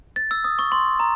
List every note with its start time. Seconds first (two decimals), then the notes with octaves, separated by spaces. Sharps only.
0.16 A6
0.31 E6
0.44 D#6
0.59 C#6
0.72 C6
1.00 A#5